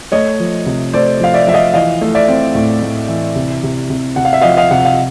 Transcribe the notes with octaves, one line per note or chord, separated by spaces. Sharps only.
A3 C#5 D#5
F3
C3
A3 C5 D5
F3 F5
D5 E5
F3 E5
D#5 F5
E3 D#5 F5
A3
D5 E5
C4
A2
A2
E3
C3
C3
C3
C3 F#5
F5
E5
F3 D#5 F5
D#5 F5
C3 F#5
F5